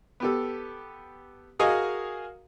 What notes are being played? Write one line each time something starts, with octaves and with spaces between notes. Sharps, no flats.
B3 G4 A4
F#4 G#4 A#4 D#5 F5 G#5